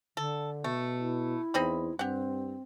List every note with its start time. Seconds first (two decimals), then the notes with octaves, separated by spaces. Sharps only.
0.17 D3 A4
0.64 B2 A3
0.99 E4
1.54 E2 C4 D#4 B5
1.99 G2 C4 G4 F#5